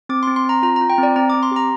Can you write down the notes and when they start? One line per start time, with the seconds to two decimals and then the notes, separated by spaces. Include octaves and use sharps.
0.09 C4 D6
0.23 C6
0.27 C4
0.36 C6
0.45 C4 A#5
0.63 F4 A#5
0.76 F4 A#5
0.90 G5
0.98 C4
1.03 D5
1.16 C4 A#5
1.30 C4 D6
1.43 C6
1.51 G4 A#5